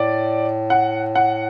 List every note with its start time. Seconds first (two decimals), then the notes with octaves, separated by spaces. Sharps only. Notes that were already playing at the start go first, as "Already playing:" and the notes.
Already playing: A2 D5
0.70 F#5
1.15 F#5